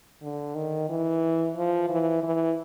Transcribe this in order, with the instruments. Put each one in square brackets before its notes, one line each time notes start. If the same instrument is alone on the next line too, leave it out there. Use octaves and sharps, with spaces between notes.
[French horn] D3
D#3
E3
F3
E3
E3